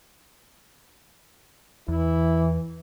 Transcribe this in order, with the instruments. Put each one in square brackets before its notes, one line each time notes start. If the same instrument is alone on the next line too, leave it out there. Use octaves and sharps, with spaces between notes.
[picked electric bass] E2 [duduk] E3 [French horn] E4